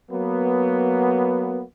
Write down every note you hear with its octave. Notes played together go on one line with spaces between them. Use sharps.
F#3 A#3 B3